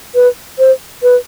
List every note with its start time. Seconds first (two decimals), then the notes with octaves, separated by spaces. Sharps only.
0.15 B4
0.58 C5
1.03 B4